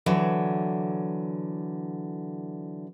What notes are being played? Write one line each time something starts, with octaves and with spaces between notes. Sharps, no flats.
D3 E3 F#3